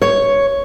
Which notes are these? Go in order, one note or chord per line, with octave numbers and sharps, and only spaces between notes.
C#5